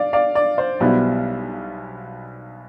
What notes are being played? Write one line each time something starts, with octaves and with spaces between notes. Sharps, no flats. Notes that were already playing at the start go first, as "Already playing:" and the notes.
Already playing: D5 F5
D5 F5
D5
C5
B1 B2 G3 B3 E4